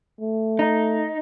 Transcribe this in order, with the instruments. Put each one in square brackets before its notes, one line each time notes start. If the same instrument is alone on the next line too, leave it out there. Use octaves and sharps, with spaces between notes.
[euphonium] A3
[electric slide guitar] D#4